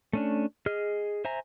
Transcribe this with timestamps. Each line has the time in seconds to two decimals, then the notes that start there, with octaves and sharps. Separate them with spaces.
0.13 A3 C#4 D4
0.66 G#4 D#5 F6
1.25 C5 E5 G#5 A#5